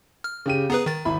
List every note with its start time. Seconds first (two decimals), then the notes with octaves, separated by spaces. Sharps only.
0.24 F6
0.46 C#3 G4 D#7
0.70 B3 G#4 B4 A#5
0.86 D#3 A6
1.05 G#1 E4 B5